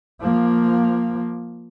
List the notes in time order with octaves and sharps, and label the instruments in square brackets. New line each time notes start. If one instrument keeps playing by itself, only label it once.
[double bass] F3 A#3